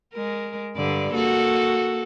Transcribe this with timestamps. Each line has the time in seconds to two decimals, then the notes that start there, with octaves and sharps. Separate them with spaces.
0.14 G#3 A#4
0.77 G2 D3 D5
1.14 A#3 F#4 A4